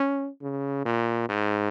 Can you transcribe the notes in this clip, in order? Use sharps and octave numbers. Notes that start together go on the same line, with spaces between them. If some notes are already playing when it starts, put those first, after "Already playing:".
Already playing: C#4
C#3
A#2
G#2